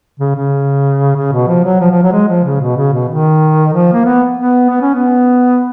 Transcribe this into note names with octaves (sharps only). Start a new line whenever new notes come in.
C#3
C#3
C#3
B2
F3
F#3
F3
F3
F#3
G#3
F3
C#3
B2
C#3
B2
D#3
F3
A#3
B3
B3
B3
C#4
B3